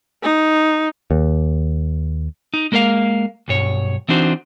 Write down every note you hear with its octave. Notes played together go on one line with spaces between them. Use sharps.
D#4
D#2
D#4
G#3 A#3 A#4 C5 F5
B1 G2 C#5
E3 C4 D4 D#4 F#4 C5